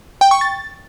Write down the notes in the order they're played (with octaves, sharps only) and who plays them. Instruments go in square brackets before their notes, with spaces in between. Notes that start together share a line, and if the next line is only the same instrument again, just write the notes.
[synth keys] G5
C#6
A6